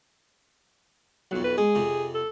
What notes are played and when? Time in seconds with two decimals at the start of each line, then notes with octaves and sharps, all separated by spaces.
1.31 B1 F2 F#3
1.44 B4
1.58 G#3 G#4
1.75 F2 C3
2.14 A4